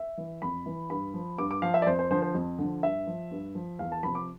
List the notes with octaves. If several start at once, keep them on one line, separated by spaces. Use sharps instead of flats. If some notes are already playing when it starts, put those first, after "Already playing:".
Already playing: E5
E3
F2 B5
E3
G2 B5
F3
G2 D6
D6
F3 F5
E5
D5
F2 C5
C5
D3 F3 C5
C5
F2
D3 F3
G2 E5
F3
G2
F3
E2 F5
A5
C3 F3 B5
D6